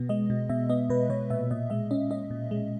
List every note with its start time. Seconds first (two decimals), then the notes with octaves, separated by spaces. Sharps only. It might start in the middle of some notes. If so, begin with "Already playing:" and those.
Already playing: B2 B3
0.09 G#3 D#5
0.30 B2
0.49 B2 E5
0.69 B3 D#5
0.90 B2 B4
1.10 B2 C#5
1.30 A#2 E5
1.51 A#2 D#5
1.70 G#3 E5
1.91 C#4 D#5
2.11 C#4 D#5
2.31 A#2
2.51 G#3